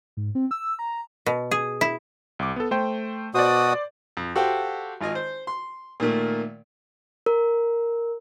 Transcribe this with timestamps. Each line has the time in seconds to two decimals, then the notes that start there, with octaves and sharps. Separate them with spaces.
0.17 G#2
0.35 C4
0.51 E6
0.79 A#5
1.26 B2
1.51 G#4
1.81 E4
2.39 C2 D6
2.56 B3 A4
2.71 A3 C5 G5
3.35 B2 F#4 C5 D5 D#6
4.17 F2
4.36 F#4 G4 A4 C5 F5 G5
5.01 G#1 F4 D#5 G#5
5.15 C5
5.47 C6
6.00 A#2 D#3 A3 A#3
7.26 A#4